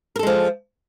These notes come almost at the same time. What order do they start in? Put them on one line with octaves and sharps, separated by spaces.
A#4 A4 G#3 F3